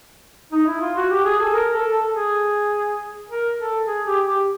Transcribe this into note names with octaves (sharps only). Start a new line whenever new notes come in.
D#4
E4
F4
F#4
G4
G#4
A4
A#4
A4
A4
G#4
A#4
A4
G#4
G4
G4